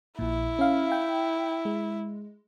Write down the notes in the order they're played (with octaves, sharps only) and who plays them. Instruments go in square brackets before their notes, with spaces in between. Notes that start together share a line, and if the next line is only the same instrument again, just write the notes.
[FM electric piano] A#1 A#2 [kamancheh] E4
[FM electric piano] C#4 F5
G5
G#3